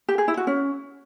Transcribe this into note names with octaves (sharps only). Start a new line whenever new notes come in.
G4
G#4
E4
F#4
C#4